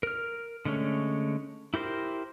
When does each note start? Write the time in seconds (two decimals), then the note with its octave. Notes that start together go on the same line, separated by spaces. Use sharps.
0.03 A#4 F6
0.65 D3 G#3 A3 C#4
1.74 E4 G4 A#4 C5